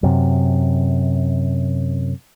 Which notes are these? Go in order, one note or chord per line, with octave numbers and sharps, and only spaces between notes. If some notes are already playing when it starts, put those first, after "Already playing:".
F#2 C3